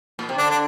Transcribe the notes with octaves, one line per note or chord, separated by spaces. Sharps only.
A#2
C3
D3 D4
D4